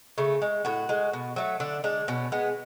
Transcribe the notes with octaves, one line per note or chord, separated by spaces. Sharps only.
C#3 A3
G#3
A2 F#4
G#3
B2
F#3 A3
D3 D4
G#3 D4
B2 C#4
G#3 B3